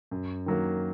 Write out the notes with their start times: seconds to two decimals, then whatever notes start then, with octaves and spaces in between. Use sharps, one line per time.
0.11 F#2
0.46 D#3 F#3 A#3